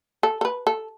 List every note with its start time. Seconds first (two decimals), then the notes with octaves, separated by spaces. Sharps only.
0.23 A4
0.41 A4
0.45 B4
0.67 A4